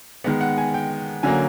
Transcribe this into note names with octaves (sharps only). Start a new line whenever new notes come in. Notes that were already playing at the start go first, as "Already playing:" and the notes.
D#3 G#3 B3 F#5
F#5
G#5
G5
D3 F#3 A#3 C#4 G#5